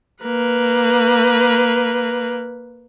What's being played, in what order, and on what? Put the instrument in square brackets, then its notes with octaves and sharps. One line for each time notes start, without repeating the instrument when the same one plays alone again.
[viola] A#3 B4